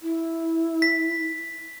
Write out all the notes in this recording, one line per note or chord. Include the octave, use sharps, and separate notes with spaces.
E4
B6